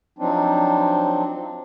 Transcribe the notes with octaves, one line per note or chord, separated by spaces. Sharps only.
F3 F#3 C4 D4 D#4